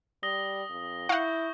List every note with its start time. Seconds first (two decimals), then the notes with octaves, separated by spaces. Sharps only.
0.23 G3 D#6 A#6 G7
0.70 F2
1.09 E4 F5 F#5 C#6 G6